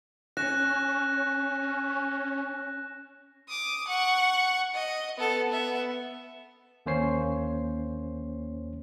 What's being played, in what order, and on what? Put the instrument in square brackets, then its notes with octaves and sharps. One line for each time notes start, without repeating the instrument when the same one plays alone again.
[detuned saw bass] C#4 [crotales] F#6 A#6 E7
[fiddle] D6 D#6
F#5 C#6
D#5
B3 A4
B3 E5
[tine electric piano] D#2 A#3 C#4 C5 C#5 C7